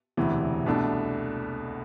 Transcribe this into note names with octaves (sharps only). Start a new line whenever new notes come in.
E1 D2 C3 E3
C2 B2 A3 D4 A4